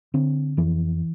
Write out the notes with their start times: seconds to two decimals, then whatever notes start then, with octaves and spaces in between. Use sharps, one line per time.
0.14 D3 C4
0.57 F2 E3